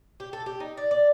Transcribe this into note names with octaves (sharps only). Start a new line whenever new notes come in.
G4
A4
G4
D#4
D5
D5